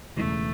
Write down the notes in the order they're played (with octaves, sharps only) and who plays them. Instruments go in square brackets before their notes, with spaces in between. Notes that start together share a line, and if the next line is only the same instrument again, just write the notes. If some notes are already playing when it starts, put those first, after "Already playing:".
[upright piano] E1 E2 C#3 E3 [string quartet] A3